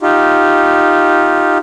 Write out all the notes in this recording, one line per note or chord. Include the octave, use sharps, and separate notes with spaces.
D#4 F4 G4